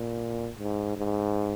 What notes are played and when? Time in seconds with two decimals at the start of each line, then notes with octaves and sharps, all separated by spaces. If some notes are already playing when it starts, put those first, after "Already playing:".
Already playing: A#2
0.59 G#2
0.97 G#2